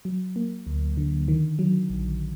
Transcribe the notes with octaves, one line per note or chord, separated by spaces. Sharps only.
F#3
A#3
D2
D3
D#3
F#3
A#1